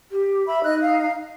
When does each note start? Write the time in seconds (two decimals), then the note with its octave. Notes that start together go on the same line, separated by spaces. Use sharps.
0.11 G4
0.47 E5 B5
0.64 D#4 D#5 F#6
0.82 F5